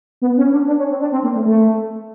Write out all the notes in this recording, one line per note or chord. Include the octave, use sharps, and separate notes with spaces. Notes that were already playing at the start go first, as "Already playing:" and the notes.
B3
C#4
D4
D4
C#4
C4
D4
C4
A#3
A3
A3